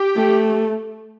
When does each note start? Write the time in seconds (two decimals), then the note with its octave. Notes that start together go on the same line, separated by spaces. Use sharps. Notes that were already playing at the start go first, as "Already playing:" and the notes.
Already playing: G4
0.16 A3